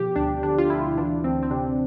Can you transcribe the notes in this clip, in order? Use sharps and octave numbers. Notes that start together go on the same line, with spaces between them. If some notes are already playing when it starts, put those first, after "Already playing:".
Already playing: B2 F3 G4
D2 D4
D3 D4
F4
D2 E4
E3 D4
D2 C4
C4
C3 D4